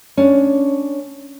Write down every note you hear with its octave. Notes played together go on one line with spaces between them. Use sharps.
C#4 D4